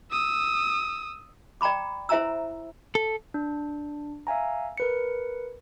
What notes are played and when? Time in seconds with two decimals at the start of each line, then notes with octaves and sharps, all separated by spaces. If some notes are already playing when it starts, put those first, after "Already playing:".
0.11 D#6 E6
1.61 D5 G5 A#5 B5 D6
2.09 E4 C5 E5 G#5 A#5 E6
2.95 A4
3.34 D4
4.27 E5 F5 G#5 A#5
4.77 A#4 B4 C#7